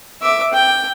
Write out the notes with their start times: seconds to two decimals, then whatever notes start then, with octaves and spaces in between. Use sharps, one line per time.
0.22 E5 D6
0.53 G5